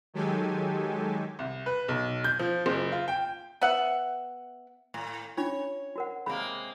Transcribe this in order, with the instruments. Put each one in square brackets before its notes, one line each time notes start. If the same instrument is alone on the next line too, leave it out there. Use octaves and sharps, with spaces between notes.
[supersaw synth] D#3 F#3 G#3 G4 A4 G#5
[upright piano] C2
B4
B1
G6
F3
F#1
F4
G5
[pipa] B3 E5 F#5
[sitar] A2
[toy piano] C#4 D4 F4 [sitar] C#5
[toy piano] F#4 A#4 F#5
[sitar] C3 G#3 A#3 [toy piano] G#4 B5